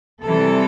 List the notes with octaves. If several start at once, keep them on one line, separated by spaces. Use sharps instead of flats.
C3 E3 G3 A4